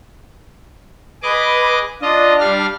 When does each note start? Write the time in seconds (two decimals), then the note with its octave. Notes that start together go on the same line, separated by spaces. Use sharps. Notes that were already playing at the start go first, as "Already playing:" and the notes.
1.22 G#4 B4 D#5 D6
2.02 D4 F4 D#5
2.40 G3 F5 F6